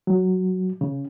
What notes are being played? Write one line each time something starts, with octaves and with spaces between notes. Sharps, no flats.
F#3
C#3